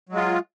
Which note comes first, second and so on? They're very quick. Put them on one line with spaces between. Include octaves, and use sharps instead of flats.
F#3 G#3 F4